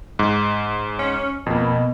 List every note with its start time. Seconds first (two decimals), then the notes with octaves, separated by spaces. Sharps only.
0.19 G#2
0.99 C#4
1.46 F2 B2 A#3